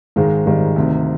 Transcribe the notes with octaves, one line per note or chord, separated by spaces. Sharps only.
G#1 G#2 D#3 G#3
G#1 G#2 D#3 G3
D2 C3 D#3